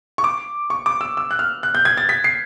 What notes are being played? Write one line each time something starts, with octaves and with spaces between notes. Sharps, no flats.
C#6
D6
C#6
D6
E6
E6
F#6
F6
F#6
G6
G#6
A6
B6
C7